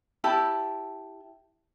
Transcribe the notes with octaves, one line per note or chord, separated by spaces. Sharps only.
E4 G4 A5